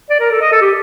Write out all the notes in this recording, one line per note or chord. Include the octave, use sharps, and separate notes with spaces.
D5
A#4
A4
D#5
A4
G4